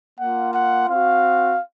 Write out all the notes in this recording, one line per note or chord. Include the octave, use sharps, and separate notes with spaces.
A#3 F4 F#5
F#5
C4 F#4 F5